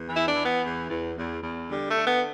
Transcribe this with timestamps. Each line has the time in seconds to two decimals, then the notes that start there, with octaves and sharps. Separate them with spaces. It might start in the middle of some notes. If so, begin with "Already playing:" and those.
Already playing: E2
0.08 E3
0.16 E4
0.27 D4
0.35 E3
0.45 B3
0.63 E2
0.90 E2
1.16 E2
1.43 E2
1.70 D3 G3
1.89 A3
1.98 D3
2.06 B3